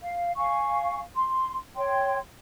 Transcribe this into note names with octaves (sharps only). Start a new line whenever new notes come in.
F5
F5 G#5 C#6
C6
C#5 G5 C6